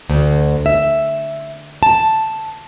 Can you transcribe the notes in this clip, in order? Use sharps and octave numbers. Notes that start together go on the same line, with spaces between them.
D2
E5
A5